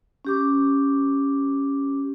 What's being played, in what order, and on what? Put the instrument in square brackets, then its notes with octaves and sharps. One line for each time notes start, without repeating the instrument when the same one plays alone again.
[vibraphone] C#4 G4 D6